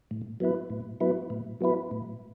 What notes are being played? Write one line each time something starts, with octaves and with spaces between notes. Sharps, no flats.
A2
F#3 B3 E4 B4
A2
F#3 B3 E4 B4
A2
F#3 B3 E4 B4
A2